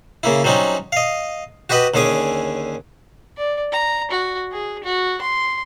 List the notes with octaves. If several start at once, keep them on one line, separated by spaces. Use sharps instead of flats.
C#3 A#3 E4
F#3 G3 C4 C#4 D#4
D#5 F5
F#4 G4 B4 D#5 F#5
D#2 D3 C#4 G#4 G#5 D6
D5
A#5
F#4
G#4
F#4
C6